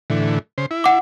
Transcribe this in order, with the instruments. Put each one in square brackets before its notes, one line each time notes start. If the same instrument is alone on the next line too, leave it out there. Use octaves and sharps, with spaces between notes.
[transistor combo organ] A2 D3 E3
C#3 C5
E4
[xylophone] F#5 D6